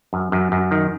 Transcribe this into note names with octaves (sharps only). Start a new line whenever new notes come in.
F#2
F#2
F#2
D#3